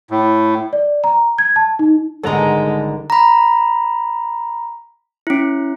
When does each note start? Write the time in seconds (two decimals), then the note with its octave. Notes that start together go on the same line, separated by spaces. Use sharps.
0.11 A2
0.73 D5
1.04 A#5
1.38 G#6
1.56 A5
1.79 D#4
2.23 G#1 D3 G3 G#3 B3 A4 F#5 A#5
3.10 A#5 B5
5.27 C#4 E4